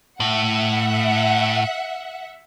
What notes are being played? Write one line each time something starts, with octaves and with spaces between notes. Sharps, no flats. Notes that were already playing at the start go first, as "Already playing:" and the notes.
A2 E5 F#5